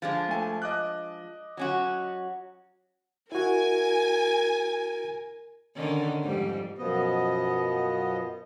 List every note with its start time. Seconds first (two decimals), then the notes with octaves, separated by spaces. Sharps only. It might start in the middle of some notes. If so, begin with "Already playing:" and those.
0.02 F3 G#3 D4
0.28 A3 G#5
0.62 D#5 D6 F#6
1.57 F#3 C#4 F#4
3.32 E4 F#4 A#4 G#5
5.76 D3 D#3 C#4
6.22 F2 G#2 G3
6.78 F#2 B2 F3 B3 D#5